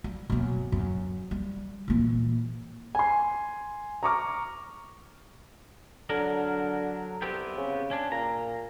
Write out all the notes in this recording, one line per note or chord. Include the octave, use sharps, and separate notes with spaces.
G3
F#2 B2
F#2
G3
A#2 E3
G#5 C6
A#5 C#6 D6 F6
D3 F#3 D4 A#4
C2 B3 C4 G4
C#3
C#4 D4
A#2 A#5